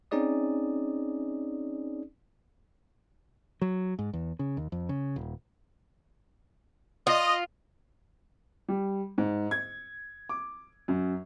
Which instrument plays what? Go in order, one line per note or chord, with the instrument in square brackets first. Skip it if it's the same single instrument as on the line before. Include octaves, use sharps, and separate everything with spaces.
[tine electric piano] C4 C#4 D#4 G#4 D5 D#6
[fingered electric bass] F#3
G#2
E2
C#3
D#2
F2
C#3
D#1
[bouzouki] F4 [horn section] D#5
[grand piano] G3
G#2
G#6
D6
F#2